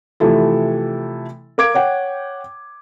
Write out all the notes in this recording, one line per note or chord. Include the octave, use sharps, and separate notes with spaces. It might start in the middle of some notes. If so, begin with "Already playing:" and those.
C3 E3 F3 A3 E4 A4
A#4 F5 D6 G#6 D7
C#5 F#5 G5